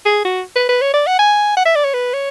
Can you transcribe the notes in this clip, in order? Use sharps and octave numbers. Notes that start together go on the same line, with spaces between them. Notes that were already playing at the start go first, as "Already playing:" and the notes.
G#4
F#4
B4
B4
C#5
D5
F#5
G#5
F#5
E5
D5
C#5
B4
C#5